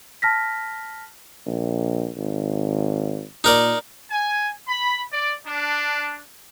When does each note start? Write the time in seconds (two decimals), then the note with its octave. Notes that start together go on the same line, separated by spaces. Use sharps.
0.22 A5 F6 A#6 B6
1.46 A#1
2.17 G#1
3.44 A#2 D#4 A#4 D5
4.10 G#5
4.67 B5
5.12 D5
5.45 D4